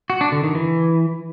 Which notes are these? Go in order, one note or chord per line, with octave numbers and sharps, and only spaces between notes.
F#4
D4
D3
D#3
E3